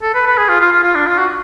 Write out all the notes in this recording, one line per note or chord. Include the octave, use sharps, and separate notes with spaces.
A4
B4
B4
G#4
F4
F4
F4
F4
D4
F4
F#4